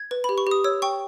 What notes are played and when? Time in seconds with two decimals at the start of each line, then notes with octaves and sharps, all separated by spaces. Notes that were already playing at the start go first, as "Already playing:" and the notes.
Already playing: G#6
0.11 B4
0.24 G4 B5
0.38 C#6
0.47 G4 D#6
0.64 C#5 E6
0.82 G5 C#6